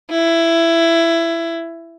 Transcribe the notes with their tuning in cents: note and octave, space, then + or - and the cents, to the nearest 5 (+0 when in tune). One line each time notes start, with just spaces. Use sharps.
E4 +15